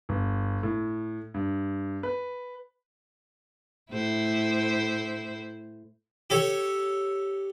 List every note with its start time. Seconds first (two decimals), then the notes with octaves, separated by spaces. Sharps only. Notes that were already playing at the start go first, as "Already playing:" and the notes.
0.09 G1
0.63 A2
1.34 G2
2.03 B4
3.91 A2 E4 C5
6.30 G4 A4 C#5